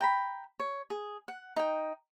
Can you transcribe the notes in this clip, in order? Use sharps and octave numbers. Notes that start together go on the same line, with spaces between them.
G5 A#5 B5
C#5
G#4
F#5
D#4 G5